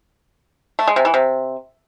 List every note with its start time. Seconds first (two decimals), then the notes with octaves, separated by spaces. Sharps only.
0.79 A3
0.87 G#3
0.96 C3
1.05 E3
1.14 C3